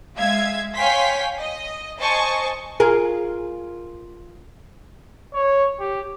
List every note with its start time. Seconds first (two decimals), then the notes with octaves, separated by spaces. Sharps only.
0.17 G#3 E5 F5 G#6
0.76 C#5 F5 G5 G#5 C6 B6
1.38 D#5
1.99 C5 D#5 G#5 A5 C#6
2.80 F4 G#4 A#4
5.34 C#5
5.80 G4